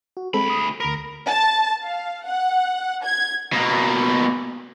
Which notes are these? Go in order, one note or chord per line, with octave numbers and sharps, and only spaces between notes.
F#4
D2 G#3 C4 A4 B5
D#6
D2 A#4 B5
A5
F5
F#5
G#6
B2 A#3